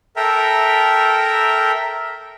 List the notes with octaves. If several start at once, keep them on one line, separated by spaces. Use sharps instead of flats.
A4 A#4 E5 G5 A#5